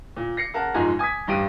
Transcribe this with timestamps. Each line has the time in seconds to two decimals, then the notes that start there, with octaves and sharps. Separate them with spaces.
0.16 A#2
0.37 A#6 C7 C#7
0.54 C#3 A#4 F#5 A5
0.74 F#1 G#2 F3 G#3 G#5 A#5
0.99 G#5 D#6 G#6 B6
1.27 A1 G2 G4 D7 D#7